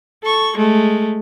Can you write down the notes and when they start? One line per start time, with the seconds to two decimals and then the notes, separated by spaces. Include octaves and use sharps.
0.24 A4 C#6
0.57 G#3 A3